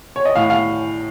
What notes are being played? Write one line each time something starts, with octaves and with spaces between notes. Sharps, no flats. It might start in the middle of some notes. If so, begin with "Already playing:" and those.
C#5
D#5
A2 F5
F5